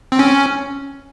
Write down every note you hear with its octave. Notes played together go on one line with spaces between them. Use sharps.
C4
C#4